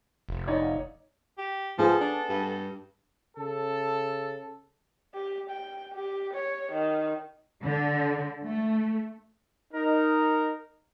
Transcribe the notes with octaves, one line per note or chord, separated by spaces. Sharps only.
F1
D#4 C#5 D5
G4
F3 B3 G#4 A4
D4
G2
C#3 A4
G4
G5
G4
C#5
D#3
D3
A3
D#4 A#4